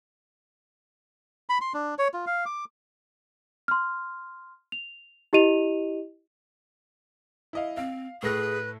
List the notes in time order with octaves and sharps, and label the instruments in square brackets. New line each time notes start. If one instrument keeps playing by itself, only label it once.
[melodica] B5
C6
D4
C#5
F4
F5
D6
[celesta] C6 F6
F7
E4 G4 D#5 D#7 F7
[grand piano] E4 D#5 F5
[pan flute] C4 [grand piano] F5
[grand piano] A2 A3 A#6 [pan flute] G#4 [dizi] B4